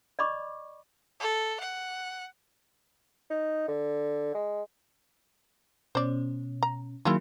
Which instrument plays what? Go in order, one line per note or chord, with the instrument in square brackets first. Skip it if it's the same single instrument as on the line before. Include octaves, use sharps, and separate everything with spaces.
[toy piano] D5 D#5 B5 C#6 D6
[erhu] A4
F#5
[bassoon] D#4
D3
G#3
[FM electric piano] B2 C#4 [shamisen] C5 D5
[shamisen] A#5
[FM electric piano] D#3 F#3 A#3 [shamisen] E4 F4 G#4